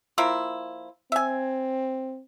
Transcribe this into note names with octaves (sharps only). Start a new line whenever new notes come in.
F3 A#3 E4
C4 E5 G#5